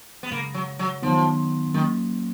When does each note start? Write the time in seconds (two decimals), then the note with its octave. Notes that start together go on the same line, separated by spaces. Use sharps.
0.23 B3
0.31 F#2 C#3 G#3 A#3
0.54 F#3
0.79 F#3
1.02 F#2 D#3 F3 F#3 B3 D#4
1.73 D#3 F#3 A#3 C#4